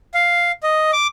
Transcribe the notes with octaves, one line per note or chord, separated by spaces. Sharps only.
F5
D#5
D6